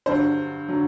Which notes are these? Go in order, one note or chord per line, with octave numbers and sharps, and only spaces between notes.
G2 D3 F#3 C5
D3 F#3